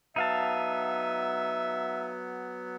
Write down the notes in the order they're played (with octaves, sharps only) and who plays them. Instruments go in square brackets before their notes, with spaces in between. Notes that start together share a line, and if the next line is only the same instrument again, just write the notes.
[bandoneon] F#3 B3 [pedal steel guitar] D#4 F5 A5 [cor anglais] E5